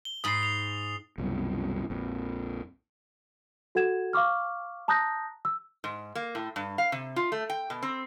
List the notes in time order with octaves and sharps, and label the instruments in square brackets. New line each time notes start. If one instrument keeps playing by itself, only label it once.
[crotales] G7
[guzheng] G#2 B5 [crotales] D#6 C7
[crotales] C7 F7
[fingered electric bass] C2 F#2 B2
A#1 F2
[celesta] F#4 A4 F#5 G#6 E7
F5 C#6 D6 F6
A5 A#5 D#6 F#6 G6 A#6
E6
[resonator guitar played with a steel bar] G#2
A#3
A2
G2
F5
C3
F4
A3
G5
B2
C4